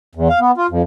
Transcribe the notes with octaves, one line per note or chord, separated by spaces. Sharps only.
E2
F5
B3
F4
F2